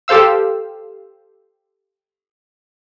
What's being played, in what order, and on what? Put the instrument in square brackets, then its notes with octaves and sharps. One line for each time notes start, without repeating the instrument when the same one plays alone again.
[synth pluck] G4 A4 C5 F5 E6